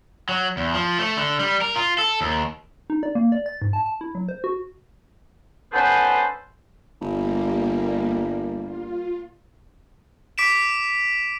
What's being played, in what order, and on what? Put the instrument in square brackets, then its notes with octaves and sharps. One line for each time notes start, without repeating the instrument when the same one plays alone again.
[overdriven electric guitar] F#3
E2
F3
A3
D3
G3
A#4
F4
A4
D#2
[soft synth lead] D#4
D5
A#3
D5
A6
G#2
A5
A5
E4
F#3
C5
F#4
[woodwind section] B3 C#4 D#4 A4 B4 C5
[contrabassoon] G1 [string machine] G3 A#3
[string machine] F4
[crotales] D6 B6 D7 E7